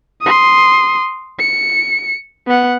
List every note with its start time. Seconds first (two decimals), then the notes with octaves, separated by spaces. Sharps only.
0.22 C6 D#6
1.39 C#7
2.47 B3 F#5